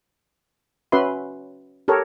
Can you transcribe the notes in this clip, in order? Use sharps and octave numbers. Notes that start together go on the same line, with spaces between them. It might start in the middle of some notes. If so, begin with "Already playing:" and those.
C#4 F#4 B4 E5 C6
G4 A4 A#4 C#5